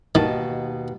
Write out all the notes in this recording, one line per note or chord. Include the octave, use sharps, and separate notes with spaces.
D#2 B2 D#3 A5